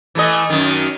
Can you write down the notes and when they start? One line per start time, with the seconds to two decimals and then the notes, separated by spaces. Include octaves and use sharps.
0.15 E3 A3 D#5
0.50 F#2 D#3